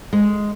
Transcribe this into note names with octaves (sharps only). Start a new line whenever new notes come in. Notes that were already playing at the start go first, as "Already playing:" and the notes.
G#3